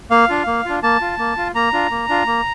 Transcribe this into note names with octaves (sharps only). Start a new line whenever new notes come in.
A#3 F5
D4 F4
A#3
D4 F4
A#3 A5
F4
A#3
F4
A#3 A#5
D4 F4
A#3
D4 F4
A#3